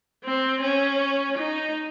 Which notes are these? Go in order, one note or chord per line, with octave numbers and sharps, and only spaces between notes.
C4
C#4
D#4